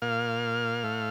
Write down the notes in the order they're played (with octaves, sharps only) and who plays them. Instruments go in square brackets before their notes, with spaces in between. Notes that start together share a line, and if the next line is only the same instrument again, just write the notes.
[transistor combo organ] A#2 F5
A2